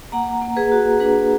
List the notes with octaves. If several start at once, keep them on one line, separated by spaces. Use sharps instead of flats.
A#3 F#5 A#5
A#3
G#4 B4
F#4
D4 G#4 B4